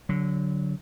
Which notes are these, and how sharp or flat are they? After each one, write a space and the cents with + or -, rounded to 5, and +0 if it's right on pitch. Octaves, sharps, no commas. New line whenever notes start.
D3 -20 F#3 +0